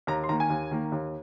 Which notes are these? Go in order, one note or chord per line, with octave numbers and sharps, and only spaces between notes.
D#2 A#5
C6
D#3 A#3 A#5
G#5
D#2
D#3 A#3
D#2